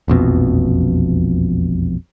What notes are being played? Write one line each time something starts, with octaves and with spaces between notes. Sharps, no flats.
E1 A#1 F2 B2